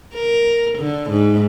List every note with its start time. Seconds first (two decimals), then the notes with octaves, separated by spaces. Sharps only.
0.15 A#4
0.78 D3
1.10 G#2